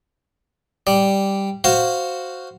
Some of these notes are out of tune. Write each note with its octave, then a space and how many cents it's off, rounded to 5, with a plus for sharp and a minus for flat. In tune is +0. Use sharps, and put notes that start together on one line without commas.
G3 +0 D5 +0
F#4 +0 C5 +0 F5 +0